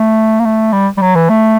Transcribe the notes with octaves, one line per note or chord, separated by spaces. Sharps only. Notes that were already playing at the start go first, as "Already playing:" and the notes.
Already playing: A3
A#3
A3
G3
G3
F#3
E3
A3